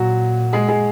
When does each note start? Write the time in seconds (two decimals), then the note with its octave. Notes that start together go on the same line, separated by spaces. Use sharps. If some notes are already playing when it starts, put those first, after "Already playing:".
Already playing: A#2 F#3 F#4
0.53 G#3 G#4
0.68 G#3 G#4